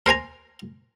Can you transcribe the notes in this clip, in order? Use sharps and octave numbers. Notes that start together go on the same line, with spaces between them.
A#4 C5 G#5 A#5